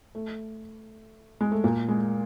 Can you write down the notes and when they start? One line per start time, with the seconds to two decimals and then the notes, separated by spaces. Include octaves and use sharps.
0.15 A3
1.41 G#3
1.52 A3
1.64 A#2 A#3
1.89 G#3